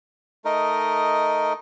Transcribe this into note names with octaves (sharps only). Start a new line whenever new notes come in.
A3 D#4 A#4 D#5